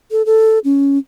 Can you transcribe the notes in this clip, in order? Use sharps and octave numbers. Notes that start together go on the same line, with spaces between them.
A4
A4
C#4